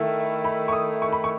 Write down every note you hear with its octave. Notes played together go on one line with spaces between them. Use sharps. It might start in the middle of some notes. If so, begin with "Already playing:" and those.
Already playing: D#3 A3 E4
B5
C#6
D#6
C#6
B5
C#6